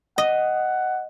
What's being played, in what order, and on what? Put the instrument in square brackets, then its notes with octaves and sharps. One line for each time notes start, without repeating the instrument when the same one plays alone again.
[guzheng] D#5 [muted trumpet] F#5